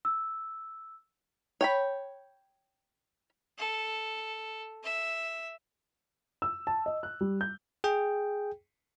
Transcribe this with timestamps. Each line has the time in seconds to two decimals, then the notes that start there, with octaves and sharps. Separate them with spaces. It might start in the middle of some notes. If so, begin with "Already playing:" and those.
0.05 E6
1.61 C#5 G5 B5
3.58 A4
4.84 E5
6.42 E6
6.67 A5
6.86 D#5
7.03 F#6
7.21 G3
7.41 G6
7.84 G#4 G5